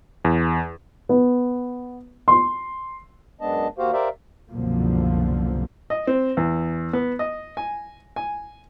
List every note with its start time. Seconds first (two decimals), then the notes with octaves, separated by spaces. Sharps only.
0.25 E2
1.09 B3
2.28 C6
3.41 F#2 G#3 B3 D4 D#5 A5
3.78 D#2 A#3 F#4 G4 C5 F5
3.93 G4 A#4 C5 D5 E5 F5
4.50 C2 F#2 B2 D3 F3 A#3
5.90 D#5
6.07 C4
6.37 E2
6.93 B3
7.19 D#5
7.57 G#5
8.16 G#5